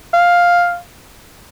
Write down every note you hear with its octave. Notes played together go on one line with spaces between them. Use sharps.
F5